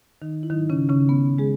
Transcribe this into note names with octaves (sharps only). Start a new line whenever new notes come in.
D#3 D#4
E4
G#2 D#3 F#3 D#4
C#3 C#4
C#3 C#4
B3
G#3 G#4